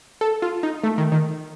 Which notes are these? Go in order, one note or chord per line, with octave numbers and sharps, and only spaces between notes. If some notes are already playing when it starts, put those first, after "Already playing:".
A4
F4
D#4
A3
D#3
D#3